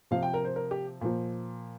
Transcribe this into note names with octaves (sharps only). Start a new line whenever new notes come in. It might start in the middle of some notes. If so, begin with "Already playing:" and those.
C3 F3 F5
G5
A#4
C5
A#4
G4
A#2 F3